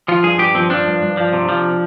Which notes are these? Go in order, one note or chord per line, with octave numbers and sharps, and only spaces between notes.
F3 F4
G2 G#4
G2 G4
F3 C4
F3 D4
G2
G2
F3
C3
F3